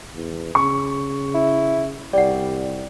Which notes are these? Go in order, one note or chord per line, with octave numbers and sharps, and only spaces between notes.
E2
C#3 C#6
E4
C2 G3 D5 F#5